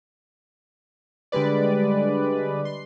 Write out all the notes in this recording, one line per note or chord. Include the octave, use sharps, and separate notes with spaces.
D3 G3 G#3 B4 D5
C6